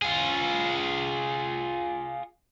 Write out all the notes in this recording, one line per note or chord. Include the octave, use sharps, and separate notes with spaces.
F4 G#4